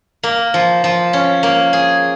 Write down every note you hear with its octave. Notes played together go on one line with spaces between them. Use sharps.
A#3
F3
F3
C#4
A#3
G#4